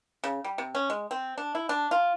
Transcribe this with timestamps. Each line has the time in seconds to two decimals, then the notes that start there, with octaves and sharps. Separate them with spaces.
0.24 C#3
0.44 G3
0.58 C3
0.75 C#4
0.90 G#3
1.11 C4
1.38 D4
1.55 E4
1.69 D4
1.91 F4